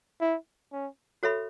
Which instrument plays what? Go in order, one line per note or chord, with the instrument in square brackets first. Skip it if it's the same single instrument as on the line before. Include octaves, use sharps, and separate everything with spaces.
[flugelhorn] E4
C#4
[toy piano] F#4 A4 C#5 E5 B5